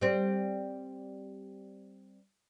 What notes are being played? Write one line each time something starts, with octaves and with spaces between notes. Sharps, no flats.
G3 C4